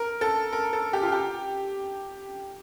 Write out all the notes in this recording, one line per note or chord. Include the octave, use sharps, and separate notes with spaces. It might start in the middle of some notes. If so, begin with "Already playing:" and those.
Already playing: A#4
A4
A#4
A4
G4
F4
G4